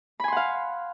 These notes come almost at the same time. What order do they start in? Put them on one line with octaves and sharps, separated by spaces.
B5 G#5 C6 F#5 F5